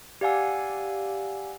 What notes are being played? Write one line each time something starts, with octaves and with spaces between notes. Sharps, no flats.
G4 D5 F5 F#5 G#5 E6